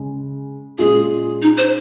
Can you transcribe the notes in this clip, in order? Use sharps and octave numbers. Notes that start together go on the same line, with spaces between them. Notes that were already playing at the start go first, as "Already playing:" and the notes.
Already playing: C#3 G#3
A#2 G#3 C#4 F4 G#4
D#4
C5